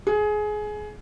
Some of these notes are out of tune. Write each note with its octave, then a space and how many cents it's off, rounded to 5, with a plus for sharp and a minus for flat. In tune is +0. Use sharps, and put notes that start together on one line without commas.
G#4 +20